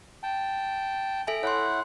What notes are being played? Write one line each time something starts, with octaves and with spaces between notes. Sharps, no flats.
G5 A5
A4 E5 G#5
E4 C#5 F#5 C6